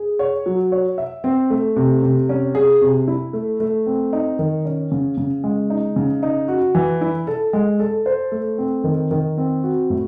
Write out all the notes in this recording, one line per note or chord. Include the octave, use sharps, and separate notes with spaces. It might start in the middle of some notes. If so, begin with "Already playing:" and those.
Already playing: G#4
C#5
F#3
C#5
E5
C4
A3
C3
C3
C#4
G#4
C3
E4
A3
A3
C4
D#4
D#3
C#4
C#3
C#3
G#3
D#4
C#3
D#4
F#4
E3
E4
A4
G#3
A4
C5
A3
C4
D#3
D#3
C4
F#4
A2